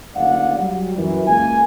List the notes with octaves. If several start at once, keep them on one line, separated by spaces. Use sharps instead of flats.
F#1 D2 D5 F5 F#5
F#3 G3
F#2 E3
C#2 A#3 G#5